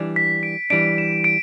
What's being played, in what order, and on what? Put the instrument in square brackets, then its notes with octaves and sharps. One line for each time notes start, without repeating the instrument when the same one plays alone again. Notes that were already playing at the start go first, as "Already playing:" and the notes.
Already playing: [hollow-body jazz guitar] E3 G3 D4
[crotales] B6
D7
[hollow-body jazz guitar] E3 G3 D4 [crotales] D7
[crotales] E7
D7